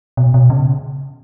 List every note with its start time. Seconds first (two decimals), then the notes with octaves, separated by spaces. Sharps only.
0.17 B2
0.34 B2
0.50 C#3